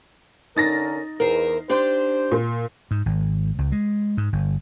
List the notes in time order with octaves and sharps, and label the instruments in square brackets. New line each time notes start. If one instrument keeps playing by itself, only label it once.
[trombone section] D3 C#4 A#4 [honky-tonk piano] D#4 A6 A#6
[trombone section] E2 [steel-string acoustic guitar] A#4 C5
[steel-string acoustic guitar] D4 G4 [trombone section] C5
[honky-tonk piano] A#2
[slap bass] G#2
G#1
C#2
G#3
G#2
G1